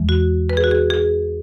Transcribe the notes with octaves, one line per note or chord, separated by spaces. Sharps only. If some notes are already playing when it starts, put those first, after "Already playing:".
Already playing: E2 E3 G#3
F#4
B4
G#4
F#4
G#4
G#4